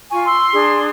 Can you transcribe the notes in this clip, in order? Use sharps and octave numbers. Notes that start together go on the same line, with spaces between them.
F4 G#5 C#6
C6 E6
D4 G#4